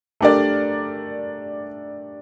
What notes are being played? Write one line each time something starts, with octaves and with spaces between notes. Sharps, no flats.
A3 D4 G4 A#4 D5